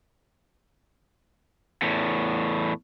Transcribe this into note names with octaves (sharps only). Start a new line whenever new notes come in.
E2 A2